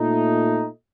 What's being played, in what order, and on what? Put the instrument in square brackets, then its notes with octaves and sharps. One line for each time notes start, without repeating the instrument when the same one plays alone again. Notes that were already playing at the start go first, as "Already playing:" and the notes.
Already playing: [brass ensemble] A#2 A3 D#4